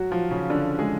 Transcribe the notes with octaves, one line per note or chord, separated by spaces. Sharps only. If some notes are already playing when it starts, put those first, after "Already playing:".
Already playing: F#3 F#4
F3 F4
C#3 C#4
D3 D4
G#3 G#4